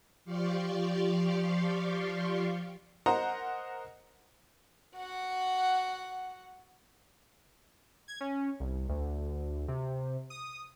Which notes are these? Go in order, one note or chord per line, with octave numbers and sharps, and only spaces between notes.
F3 G4 D5 F5 C6 C#6
A#4 C5 D#5 F#5 A#5
F#4 F#5
G#6
C#4
C2
D2
C3
D#6